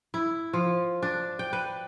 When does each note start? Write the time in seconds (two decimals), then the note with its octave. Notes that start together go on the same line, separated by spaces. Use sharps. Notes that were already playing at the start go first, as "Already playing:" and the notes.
0.14 E4
0.53 F3
1.03 D4
1.39 G5
1.53 B4